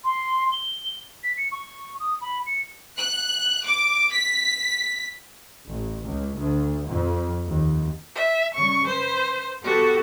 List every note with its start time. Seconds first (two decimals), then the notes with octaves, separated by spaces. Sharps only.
0.04 C6
0.52 G7
1.23 B6
1.37 C#7
1.51 C#6
1.99 D#6
2.21 B5
2.46 C#7
2.97 F#6
3.65 D6
4.12 B6
5.67 A1
6.01 C#2
6.37 D2
6.87 F2
7.46 D#2
8.15 E5
8.54 C#3 G3 C#6
8.87 B4 C5
9.64 B3 F#4 G4 A4